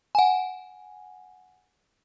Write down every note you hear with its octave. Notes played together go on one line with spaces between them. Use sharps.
F#5 G#5